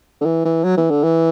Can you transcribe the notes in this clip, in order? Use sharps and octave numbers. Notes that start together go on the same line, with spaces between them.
D3
E3
E3
F#3
E3
D3
E3